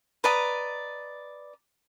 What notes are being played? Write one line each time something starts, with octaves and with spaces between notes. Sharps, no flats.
B4 D5 D#5 A#5